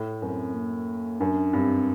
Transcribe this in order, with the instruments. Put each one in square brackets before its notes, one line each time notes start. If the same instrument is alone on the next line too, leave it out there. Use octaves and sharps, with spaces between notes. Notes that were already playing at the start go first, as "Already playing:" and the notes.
Already playing: [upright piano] A2
[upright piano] F#2 [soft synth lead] C4
[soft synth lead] A#3
[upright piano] F#2 [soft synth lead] D4
[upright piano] G2 [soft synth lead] C4